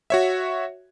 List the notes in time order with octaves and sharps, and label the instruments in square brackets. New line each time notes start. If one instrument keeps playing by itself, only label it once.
[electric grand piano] F#4 C#5 E5